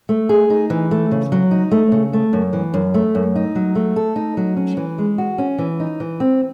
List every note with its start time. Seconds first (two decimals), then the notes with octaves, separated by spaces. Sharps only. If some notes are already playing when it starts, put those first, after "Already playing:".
0.09 A3
0.29 G#4
0.50 D#4
0.70 E3
0.91 A3
1.11 C#3
1.32 F#3
1.51 D#4
1.71 A3
1.92 C#3
2.13 A3
2.33 F#2
2.53 E3
2.74 F#2
2.94 A3
3.15 F#2
3.36 D#4
3.55 F#3
3.75 A3
3.96 A4
4.16 D#4
4.37 F#3
4.57 C#4
4.77 E3
4.98 G#3
5.18 F#4
5.38 C#4
5.58 E3
5.80 D#4
6.00 E3
6.20 C4